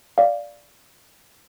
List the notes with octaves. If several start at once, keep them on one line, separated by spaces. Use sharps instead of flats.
D5 F5